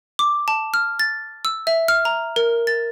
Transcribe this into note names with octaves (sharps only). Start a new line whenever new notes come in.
D6
A5
F6
A6
E6
E5
F6
A#5
A#4
A6